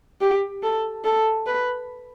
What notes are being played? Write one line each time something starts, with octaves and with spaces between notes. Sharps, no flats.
G4
A4
A4
B4